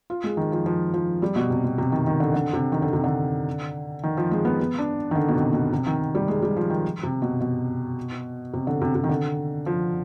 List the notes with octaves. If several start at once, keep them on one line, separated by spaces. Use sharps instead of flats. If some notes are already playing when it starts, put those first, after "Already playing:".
F4
G#3
D#3
F3
F3
F3
G3
B2
C3
B2
C3
D#3
D#3
D3
D3
C3
D#3
D3
C3
D3
D#3
F3
G#3
B3
B3
D4
D#3
D3
B2
C3
B2
C3
D#3
G3
G#3
G3
F3
D#3
C3
B2
B2
C3
D3
C3
C3
D#3
D3
F3